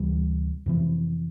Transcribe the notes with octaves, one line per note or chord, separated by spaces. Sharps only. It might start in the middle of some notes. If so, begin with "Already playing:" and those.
Already playing: D2 C3 E3 G3
F2 C3 E3